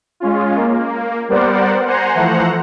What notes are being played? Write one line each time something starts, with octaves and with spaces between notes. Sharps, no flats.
G#3 C#4 F4
A#3
G3 B3 A#4 C5 D5 F#5
C5 F#5 G#5 A#5 C6
E3 F3 A3 C5 F#5 A#5